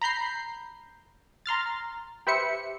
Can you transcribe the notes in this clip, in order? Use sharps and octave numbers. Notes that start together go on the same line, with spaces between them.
A#5 B5 G6 C7
A#5 C6 F6 A6
G4 B4 C5 E5 C#7